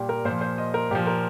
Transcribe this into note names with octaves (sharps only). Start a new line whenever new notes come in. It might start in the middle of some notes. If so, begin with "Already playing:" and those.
Already playing: A#2 G3 G4
A#4
A#2 F3 C5
C5
D#5
A#4
A#2 F3 G4
A#4